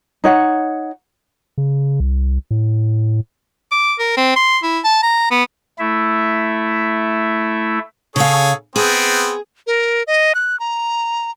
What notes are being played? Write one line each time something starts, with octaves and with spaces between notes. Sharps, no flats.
D#4 C#5 F#5
C#3
C2
A2
D6
A#4
C4
C6
E4
A5
A#5
B3
A3 E4 E5
C#3 G#4 A4 C#5 F5
B3 C4 G#4
A#4
D#5
F#6
A#5